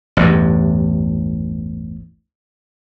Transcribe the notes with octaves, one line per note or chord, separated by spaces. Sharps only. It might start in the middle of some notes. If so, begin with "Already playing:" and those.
A1 E2 G2